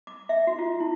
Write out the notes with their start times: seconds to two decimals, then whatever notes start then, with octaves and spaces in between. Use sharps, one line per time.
0.07 D6
0.29 E5
0.47 F#4
0.59 F4
0.80 E4